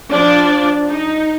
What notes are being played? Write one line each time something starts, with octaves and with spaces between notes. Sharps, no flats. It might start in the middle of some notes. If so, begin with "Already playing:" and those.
F3 D4 D5
D#4